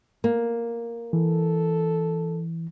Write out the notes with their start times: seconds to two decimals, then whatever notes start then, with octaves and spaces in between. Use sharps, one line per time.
0.24 A#3
1.13 E3 A4